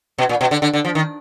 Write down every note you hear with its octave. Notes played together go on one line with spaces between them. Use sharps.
B2
A#2
B2
D3
D3
D3
F3
D#3